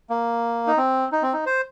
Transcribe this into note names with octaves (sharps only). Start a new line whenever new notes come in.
A#3
D#4
C4
D#4
C4
D#4
C5